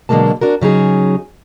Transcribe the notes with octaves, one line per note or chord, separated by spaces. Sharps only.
B2 D3 F#3 G#3 A#3 A5
D4 F#4 A#4
C#3 F#3 D#4 G#4